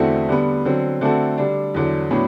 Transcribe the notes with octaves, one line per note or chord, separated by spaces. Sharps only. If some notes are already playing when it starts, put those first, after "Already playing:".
Already playing: E2 D3 A3 C4 F#4
D3 G3 B3
D3 F#3 C4
D3 A3 C4 F#4 A4
D3 G3 D4
E2 D3 F#3
A2 F#3 B3 D4